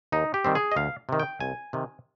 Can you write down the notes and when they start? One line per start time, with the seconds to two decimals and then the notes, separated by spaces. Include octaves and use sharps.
0.12 D#2 D#4
0.34 G4
0.45 D#3 G3 C4
0.55 G#4
0.72 D#5
0.76 D2 F5
1.09 C3 D#3
1.20 G5
1.40 C2 G#5
1.73 C3 D#3